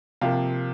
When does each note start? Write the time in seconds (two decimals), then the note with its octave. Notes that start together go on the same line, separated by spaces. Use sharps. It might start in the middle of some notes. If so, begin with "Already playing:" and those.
0.21 C3 F3 A#3 F5